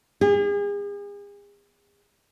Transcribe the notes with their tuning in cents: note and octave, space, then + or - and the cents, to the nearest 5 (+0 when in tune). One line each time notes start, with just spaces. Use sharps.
G#4 -40